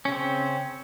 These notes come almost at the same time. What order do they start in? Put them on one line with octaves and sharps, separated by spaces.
C#4 C#3 C4